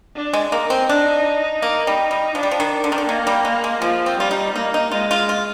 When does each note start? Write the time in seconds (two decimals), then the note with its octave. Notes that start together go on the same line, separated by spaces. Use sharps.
0.16 D4
0.33 G#3
0.52 A#3 D#4
0.70 C4
0.89 D4
1.62 A#3
1.87 G3
2.11 G3
2.35 F3 D4
2.43 G3
2.51 F3
2.60 D#3
2.84 D3
2.92 D#3
2.98 D3
3.09 D#3 A#3
3.27 G3
3.45 G#3
3.64 G#3
3.82 F3 G#3
4.06 C4
4.18 G3 F4
4.31 D#4
4.55 A#3 D#4
4.74 D#4
4.92 G#3 F4
5.11 F4
5.29 F4